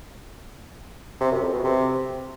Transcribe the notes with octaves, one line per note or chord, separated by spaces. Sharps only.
C3
F#2
F2
B2
C3